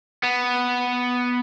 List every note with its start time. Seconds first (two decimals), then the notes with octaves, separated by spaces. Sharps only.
0.24 B3